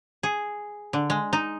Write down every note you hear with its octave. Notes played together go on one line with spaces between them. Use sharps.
G#4
D3
G#3
D#4